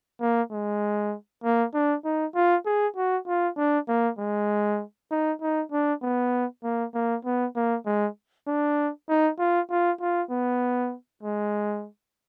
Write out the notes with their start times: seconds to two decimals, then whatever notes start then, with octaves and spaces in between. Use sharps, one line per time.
0.21 A#3
0.51 G#3
1.44 A#3
1.74 D4
2.05 D#4
2.35 F4
2.66 G#4
2.96 F#4
3.27 F4
3.58 D4
3.88 A#3
4.19 G#3
5.11 D#4
5.41 D#4
5.72 D4
6.03 B3
6.64 A#3
6.95 A#3
7.25 B3
7.56 A#3
7.86 G#3
8.48 D4
9.09 D#4
9.39 F4
9.70 F4
10.01 F4
10.31 B3
11.23 G#3